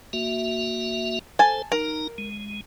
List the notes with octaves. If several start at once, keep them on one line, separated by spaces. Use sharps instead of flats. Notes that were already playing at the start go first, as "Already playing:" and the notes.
A#3 F#4 E5
A4 C5 G#5 A5
D#4 A#4 A#5
G#3